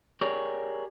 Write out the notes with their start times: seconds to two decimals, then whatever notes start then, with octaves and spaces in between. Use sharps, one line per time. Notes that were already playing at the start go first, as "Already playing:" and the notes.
0.21 G4 G#4 A#4 C#5 D5